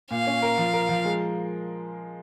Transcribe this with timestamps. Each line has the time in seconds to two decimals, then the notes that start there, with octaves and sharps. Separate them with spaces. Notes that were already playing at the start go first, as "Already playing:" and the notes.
0.11 A#2 F5
0.27 C#4
0.42 A#4
0.58 F3
0.73 A#4
0.89 F3
1.05 G#3